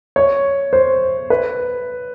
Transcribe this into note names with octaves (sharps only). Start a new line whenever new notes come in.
C#5
C5
B4